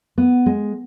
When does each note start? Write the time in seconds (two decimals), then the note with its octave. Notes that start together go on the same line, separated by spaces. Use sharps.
0.18 B3
0.46 G#3